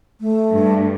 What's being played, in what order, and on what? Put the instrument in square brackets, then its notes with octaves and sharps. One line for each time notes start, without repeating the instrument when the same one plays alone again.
[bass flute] A3
[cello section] G2